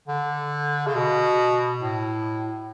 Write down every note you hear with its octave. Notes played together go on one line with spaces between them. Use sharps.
D3
C#3
B2
A2